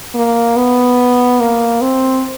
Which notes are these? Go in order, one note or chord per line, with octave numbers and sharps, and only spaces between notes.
A#3
B3
A#3
C4